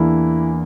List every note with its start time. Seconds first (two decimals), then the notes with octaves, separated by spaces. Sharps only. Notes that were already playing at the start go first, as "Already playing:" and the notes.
Already playing: E2 E3 A#3 D4 E4